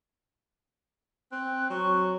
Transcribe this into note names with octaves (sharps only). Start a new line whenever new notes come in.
C4 F#6
F#3 C#6